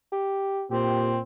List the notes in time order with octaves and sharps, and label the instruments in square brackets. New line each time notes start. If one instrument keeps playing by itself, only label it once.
[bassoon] G4
[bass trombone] A#2 [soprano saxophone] C4 [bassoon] G4